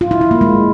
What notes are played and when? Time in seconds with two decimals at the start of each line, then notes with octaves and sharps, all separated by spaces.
0.01 F4
0.11 E4
0.21 E4
0.31 A#3
0.41 G#3